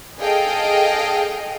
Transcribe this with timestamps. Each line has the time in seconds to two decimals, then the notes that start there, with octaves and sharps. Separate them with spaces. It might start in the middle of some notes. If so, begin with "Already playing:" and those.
0.20 G#4 A4 D#5 F5 G5